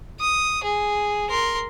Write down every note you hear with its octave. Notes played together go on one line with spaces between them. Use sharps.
D#6
G#4
A#4 C6